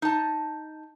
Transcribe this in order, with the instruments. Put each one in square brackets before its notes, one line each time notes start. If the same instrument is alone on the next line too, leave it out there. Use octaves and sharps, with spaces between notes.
[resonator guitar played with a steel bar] D#4 A5